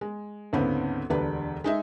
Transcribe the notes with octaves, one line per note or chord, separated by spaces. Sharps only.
G#3
D2 G#2 C#3 B3 C4
E1 D2 D4 G4 B4
G#3 D#4 E5